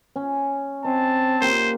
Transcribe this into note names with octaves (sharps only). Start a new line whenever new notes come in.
C#4
C4 D#5 A5
A#3 G4 C5